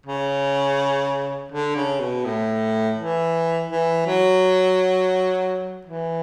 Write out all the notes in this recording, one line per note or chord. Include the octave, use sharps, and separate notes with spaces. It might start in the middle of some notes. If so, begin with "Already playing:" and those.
C#3
D3
C#3
B2
A2
E3
E3
F#3
E3